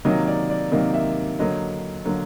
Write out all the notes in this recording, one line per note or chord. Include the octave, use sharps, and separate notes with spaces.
C3 D#3 F#3 A#3 D#5
D5
D5
C3 D#3 F#3 A#3 D#5
E5
D3 F#3 A#3 D#5
D3 F#3 A#3